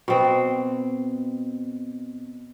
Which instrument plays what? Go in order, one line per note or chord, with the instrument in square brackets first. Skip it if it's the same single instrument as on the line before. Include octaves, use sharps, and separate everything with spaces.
[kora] B2 C4